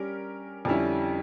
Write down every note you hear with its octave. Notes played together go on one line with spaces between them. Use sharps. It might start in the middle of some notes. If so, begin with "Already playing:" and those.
Already playing: G3 C#4 G4 A#4
F2 D3 G3 C#4 E4